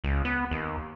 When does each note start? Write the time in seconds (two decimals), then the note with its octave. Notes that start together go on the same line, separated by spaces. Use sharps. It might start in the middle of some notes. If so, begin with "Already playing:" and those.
0.04 C#2
0.25 B3
0.51 D#2